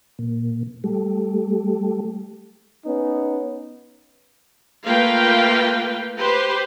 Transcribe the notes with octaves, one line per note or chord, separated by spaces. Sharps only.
A#2
G3 A3
B3 C#4 D#4
A3 A#3 F4 B4 F5 G5
G4 B4 C5